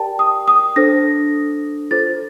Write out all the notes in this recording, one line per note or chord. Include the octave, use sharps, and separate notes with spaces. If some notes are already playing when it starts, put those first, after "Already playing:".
Already playing: G4 A#4 D5 G5 A5
D#6
D#6
D4 A4 C5 A#6
F4 A4 C5 A6